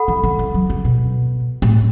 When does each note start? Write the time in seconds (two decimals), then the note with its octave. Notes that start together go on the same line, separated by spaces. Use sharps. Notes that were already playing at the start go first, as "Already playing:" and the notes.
Already playing: A4 F#5 B5
0.08 E3
0.24 C#3
0.39 E3
0.54 F#3
0.70 C#3
0.85 B2
1.62 A2